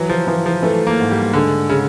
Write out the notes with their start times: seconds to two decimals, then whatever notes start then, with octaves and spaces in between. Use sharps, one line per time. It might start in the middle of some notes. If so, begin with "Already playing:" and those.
Already playing: E3 F#3
0.09 F3
0.27 E3 F3
0.46 F3
0.62 E3 A3
0.87 A#3
0.98 G#2
1.11 G3
1.33 D3 G#3
1.69 C#3